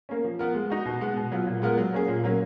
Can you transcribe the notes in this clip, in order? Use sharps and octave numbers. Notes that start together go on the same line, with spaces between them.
A#3 C#4
F3
B3 F4 A#4
G#3
D#4 F#4
B2
G#3 B3
B2
F#3 B3 F4
A#2
G#3 B3 F4 A#4
F#3
A#3 C#4 G#4
A#2
F#3 A#3 C#4